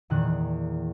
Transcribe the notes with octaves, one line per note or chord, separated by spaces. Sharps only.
E2 A#2 D#3 F#6